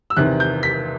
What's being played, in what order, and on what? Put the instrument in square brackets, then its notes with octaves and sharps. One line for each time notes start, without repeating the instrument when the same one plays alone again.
[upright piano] E6
E2 C3 D#3 F#6
G6
B6